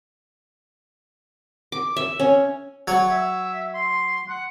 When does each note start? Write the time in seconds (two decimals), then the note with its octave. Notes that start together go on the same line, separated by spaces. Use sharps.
1.72 D6
1.96 E5
2.20 C#4
2.88 F#3 C#5
3.10 E5
3.74 C6
4.29 F#5